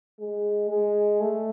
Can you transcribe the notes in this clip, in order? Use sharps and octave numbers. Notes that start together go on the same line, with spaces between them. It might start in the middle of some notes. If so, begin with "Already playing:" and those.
G#3
G#3
A3